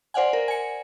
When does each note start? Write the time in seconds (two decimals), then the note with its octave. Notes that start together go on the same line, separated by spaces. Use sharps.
0.14 C5 D5 F5 F#5 G#5
0.33 A#4
0.48 G#5 C#7